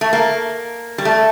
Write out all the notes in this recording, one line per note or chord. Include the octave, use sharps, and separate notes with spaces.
A3
A#3
G3
A3